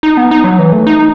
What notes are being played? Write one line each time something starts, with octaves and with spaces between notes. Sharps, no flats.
D#4
B3
D#4
F#3
E3
A3
D#4